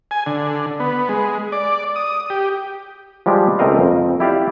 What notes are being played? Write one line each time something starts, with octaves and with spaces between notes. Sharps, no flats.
G#5
D3
B3
G#3
D5
D#6
G4
F3 G3 G#3 G4
C#2 A3 C4 A#4 D#5 F5
F2
E4 G4 D5 F5